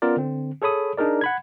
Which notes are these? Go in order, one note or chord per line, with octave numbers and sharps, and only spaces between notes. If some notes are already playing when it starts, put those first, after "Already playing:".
B3 C#4 F4 A#4 D5
D3 C4
G#4 A4 C#5 B5 D#6
D4 D#4 G#4 A#4 D5
F#5 B5 G#6